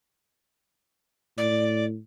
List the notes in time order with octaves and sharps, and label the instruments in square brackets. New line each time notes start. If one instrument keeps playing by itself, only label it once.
[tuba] A2 [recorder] D5